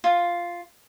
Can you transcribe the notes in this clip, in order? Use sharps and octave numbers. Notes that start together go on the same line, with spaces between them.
F4